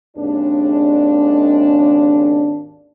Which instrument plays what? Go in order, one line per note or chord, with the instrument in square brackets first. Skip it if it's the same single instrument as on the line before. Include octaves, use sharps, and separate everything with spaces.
[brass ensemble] G#1 D#2 C#3 G#3 D4